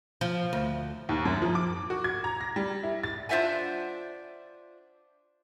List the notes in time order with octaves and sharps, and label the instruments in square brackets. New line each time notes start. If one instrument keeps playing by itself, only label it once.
[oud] F3
D2
[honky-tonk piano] D#2
F#2
F3
D6
F#4
G#6
A#5
A#6
G3
E4
A6
[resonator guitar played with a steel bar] D4 F4 C5 E5 F#5 G#5